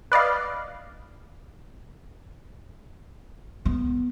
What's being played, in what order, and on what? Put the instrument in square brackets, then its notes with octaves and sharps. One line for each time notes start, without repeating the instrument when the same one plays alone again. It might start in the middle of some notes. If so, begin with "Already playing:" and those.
[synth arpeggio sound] B4 D5 D#5 F5
[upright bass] B3